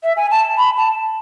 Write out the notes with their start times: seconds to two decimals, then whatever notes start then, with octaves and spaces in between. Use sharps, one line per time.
0.03 E5
0.17 G#5
0.31 A5
0.58 B5
0.77 A5